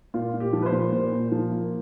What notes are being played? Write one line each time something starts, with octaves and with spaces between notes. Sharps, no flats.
A#2 F4
A#2
G4
F3
B4
C5
A#2
A#2
A#2
F3
A#3